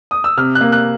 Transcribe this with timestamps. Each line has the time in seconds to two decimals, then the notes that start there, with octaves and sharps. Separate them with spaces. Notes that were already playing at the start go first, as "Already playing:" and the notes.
0.11 D#6
0.24 E6
0.37 C3 F6
0.55 F#6
0.61 A#3
0.72 F#6